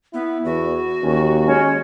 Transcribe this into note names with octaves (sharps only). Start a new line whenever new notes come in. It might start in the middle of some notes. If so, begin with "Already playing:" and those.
B3 E4
E2 F#4
D#2 C#4
G#3 C#4